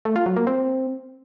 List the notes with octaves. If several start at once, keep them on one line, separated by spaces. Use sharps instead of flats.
A3
F4
F#3
A#3
C4